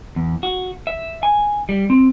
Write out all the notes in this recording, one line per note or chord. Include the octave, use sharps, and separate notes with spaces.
E2
F#4
E5
G#5
G3
C4